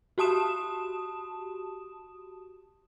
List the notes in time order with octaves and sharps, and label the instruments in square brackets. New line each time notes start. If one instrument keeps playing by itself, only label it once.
[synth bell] F#4 G4 A5 D#6 E7